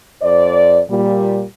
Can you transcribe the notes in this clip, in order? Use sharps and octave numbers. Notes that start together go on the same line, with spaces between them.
F2 C5 D5
A#2 G3